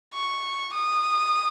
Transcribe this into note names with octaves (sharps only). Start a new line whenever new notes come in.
C#6
D#6